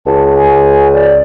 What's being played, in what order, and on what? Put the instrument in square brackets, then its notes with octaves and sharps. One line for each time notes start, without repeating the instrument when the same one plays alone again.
[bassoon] C#2 [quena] A5
[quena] G#5
D5